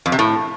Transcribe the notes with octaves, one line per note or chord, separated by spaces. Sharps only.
F2
C3
A2